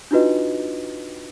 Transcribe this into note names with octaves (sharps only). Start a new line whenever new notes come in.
D4 D#4 F4 F#4 B4 D#5